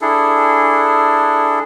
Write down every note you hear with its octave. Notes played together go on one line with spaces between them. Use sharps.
D4 E4 G#4 A4